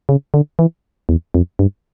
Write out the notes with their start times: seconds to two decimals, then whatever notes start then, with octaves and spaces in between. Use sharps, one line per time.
0.09 C#3
0.34 D3
0.59 E3
1.09 E2
1.34 F2
1.59 G2